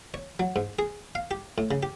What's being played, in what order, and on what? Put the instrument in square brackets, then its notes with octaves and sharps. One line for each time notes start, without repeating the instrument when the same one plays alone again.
[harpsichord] C#5
F#3
G#2
G#4
F5
G4
A2
C#3
G4